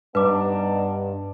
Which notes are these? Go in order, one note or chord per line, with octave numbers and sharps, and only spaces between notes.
G2 B3 D4 D#4 B4 D6